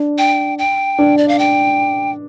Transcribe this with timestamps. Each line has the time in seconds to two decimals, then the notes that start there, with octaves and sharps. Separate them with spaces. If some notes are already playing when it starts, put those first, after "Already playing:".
Already playing: D4
0.18 G5
0.59 G5
0.99 D4
1.18 D5
1.28 F5
1.39 G5